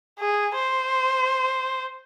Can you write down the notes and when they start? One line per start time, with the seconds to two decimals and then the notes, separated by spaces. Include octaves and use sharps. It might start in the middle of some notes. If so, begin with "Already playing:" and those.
0.19 G#4
0.55 C5